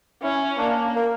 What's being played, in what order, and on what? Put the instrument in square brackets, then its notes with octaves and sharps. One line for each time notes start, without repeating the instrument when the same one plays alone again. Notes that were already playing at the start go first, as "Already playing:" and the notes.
[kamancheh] C#4 [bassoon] E4
[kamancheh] A#3 [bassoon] D4
[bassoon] A#3